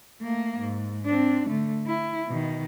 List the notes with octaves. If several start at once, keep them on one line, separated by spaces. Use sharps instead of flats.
A3 A#3
G#2
C4 D4
D3 A3
E4
B2 D#3